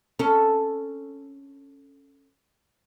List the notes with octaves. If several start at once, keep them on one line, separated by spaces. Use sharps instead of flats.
C#4 A4